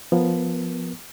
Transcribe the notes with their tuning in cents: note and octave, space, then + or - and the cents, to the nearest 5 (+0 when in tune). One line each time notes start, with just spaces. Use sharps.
F3 +0 B3 +0 A#4 +15